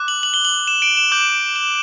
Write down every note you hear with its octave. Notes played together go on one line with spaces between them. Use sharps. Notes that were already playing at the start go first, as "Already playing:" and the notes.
Already playing: D6 F#6
F#7
F#7
G7
F#7
E7
D7
E7
D6 G6 F#7
E7